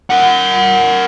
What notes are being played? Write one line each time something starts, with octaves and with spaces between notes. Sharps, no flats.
A#4 F#5